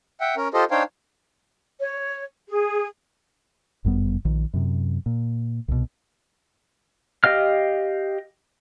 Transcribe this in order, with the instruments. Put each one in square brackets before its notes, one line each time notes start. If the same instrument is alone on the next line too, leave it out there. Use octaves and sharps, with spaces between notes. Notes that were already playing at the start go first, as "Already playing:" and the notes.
[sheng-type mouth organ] E5 F#5 G5
C#4 A#4
F4 G4 A4 C5 D#5
D4 D#4 C5 C#5 F5 G5
[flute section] C#5
G#4
[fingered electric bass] G1 F#2 G3 B3
A#1 D#3
F#2 C3
A#2
C2 B2
[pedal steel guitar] G4 D#5 F5 F6